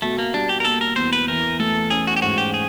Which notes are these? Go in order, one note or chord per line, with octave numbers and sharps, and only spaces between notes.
B2 A3
A#3
G3 D4
G4
A#4
A#3 A4
A#4
E2 C5
B4
E3 A#4
A3 A4
C#4 G#4
F#4
G4
G#2 F#4
G4
G#4